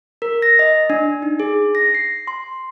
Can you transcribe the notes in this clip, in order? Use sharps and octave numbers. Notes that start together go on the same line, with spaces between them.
A#4
A#6
D#5
D4
D#4
G#4
A#6
C7
C6